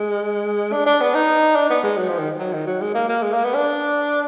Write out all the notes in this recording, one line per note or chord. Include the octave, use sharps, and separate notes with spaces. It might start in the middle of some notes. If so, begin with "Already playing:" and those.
Already playing: G#3
D4
D4
B3
D#4
D4
B3
G#3
F#3
F3
D#3
F#3
D#3
F#3
G#3
A#3
A#3
G#3
A#3
B3
D4